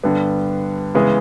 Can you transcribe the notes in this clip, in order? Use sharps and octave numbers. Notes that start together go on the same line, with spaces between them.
G2 D3 G3 B3
C#3 E3 G#3 B3